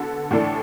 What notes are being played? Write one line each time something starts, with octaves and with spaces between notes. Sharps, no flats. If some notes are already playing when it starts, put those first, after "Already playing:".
Already playing: D3 B3 F#4 A4
A2 E3 D4 A4